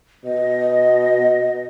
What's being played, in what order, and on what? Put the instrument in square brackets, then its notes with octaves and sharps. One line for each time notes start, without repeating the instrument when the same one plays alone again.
[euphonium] B2 [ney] D#5